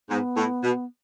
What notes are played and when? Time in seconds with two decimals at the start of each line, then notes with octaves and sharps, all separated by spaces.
0.09 G#2 B3
0.36 A2
0.63 B2